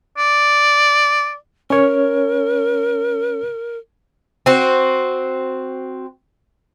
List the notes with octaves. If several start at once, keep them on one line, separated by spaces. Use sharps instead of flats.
D5
C#4 A#4 C#5
C4 F#4